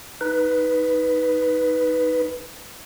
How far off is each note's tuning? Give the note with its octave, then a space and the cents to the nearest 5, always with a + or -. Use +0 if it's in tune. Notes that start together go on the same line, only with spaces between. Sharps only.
D#4 +15 B4 +0